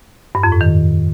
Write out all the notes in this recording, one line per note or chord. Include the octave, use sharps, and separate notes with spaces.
G2
F2
A2
D#3